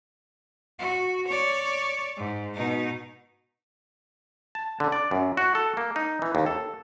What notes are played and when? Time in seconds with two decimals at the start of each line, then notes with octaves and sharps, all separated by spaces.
0.79 F#4
1.28 C#5 D5
2.17 G#2
2.54 B2 D#4
4.55 A5
4.80 D3
4.92 D5
5.11 F#2
5.37 F#4
5.55 A4
5.77 A#3
5.96 D#4
6.22 E3
6.35 D#2
6.46 A4